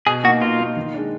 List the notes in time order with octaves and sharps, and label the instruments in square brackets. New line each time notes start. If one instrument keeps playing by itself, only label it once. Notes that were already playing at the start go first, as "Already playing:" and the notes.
[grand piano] B2 [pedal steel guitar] G#4
[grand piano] A#3 [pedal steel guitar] F#4
[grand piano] D#4
[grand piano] B2 [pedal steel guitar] F4
[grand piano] A#3 D#4
D#3
G#3 D4